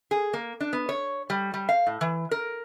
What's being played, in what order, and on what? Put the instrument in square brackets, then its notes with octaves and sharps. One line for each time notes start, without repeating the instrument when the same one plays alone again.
[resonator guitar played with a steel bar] G#4
A#3
D4
B3
C#5
G3
G3
F5
A2
E3
A#4